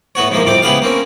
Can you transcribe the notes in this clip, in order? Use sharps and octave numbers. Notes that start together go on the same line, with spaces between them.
A2 B3 F#4 C#5
G#2 E3 F3 G#3 A#3
C2 F2 C3 C4 D6
C#2 B3 E4 G4 G#4 F5
A#3 C4 C#4